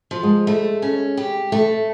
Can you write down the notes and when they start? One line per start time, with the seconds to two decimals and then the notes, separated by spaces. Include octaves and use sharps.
0.11 F3
0.23 G#3
0.47 A3
0.82 C#4
1.17 G4
1.52 A3